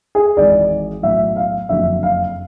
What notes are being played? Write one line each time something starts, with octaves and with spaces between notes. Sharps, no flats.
G#4
G#1 G#2 E3 D5
B1 A2 F#3 E5
F5
F#1 F2 D3 F#3 E5
F5